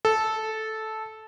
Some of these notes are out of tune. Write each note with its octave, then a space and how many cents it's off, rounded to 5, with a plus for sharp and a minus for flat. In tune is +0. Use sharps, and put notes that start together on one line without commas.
A4 -10